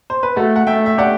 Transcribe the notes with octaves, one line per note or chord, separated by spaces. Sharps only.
C5
B4
A3 F#4 A4
F#5
A3 E5 G5
E5
G4 D5 F#5